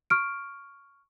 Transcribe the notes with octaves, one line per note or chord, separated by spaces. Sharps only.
C#6 F6 D7